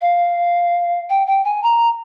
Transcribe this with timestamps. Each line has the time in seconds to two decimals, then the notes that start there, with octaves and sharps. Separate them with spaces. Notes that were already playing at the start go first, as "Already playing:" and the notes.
0.01 F5
1.10 G5
1.27 G5
1.45 G#5
1.63 A#5